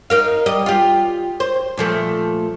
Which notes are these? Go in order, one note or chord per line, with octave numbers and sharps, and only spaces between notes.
D#4 A#4 F5
G3 D#5
F4 G4
C5
A#2 F3 A3